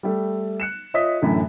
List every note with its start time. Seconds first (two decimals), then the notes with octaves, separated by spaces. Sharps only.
0.03 G3 A3
0.60 F#6 C#7 E7
0.94 F4 C#5 D#5 E5 D#6 B6
1.22 F#2 A2 D3 E3 F#3